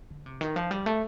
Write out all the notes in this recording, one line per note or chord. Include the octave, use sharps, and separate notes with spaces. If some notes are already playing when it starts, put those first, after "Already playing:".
D3
C3
D#3
F3
G3
A3